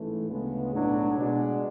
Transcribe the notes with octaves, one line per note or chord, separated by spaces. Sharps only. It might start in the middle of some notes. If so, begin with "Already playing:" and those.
Already playing: A1 G#2 E3 A3
D2 C#3 G#3 B3
B1 A2 F#3 B3 D4
B2 G#3 D4 F#4